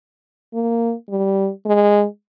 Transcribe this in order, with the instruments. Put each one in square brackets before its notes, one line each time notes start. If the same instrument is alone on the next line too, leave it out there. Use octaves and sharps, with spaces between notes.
[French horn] A#3
G3
G#3